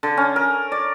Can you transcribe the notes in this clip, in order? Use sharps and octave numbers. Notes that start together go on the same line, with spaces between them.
D3
C#4
A#4
D5